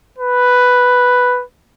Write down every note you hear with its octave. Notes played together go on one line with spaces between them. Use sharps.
B4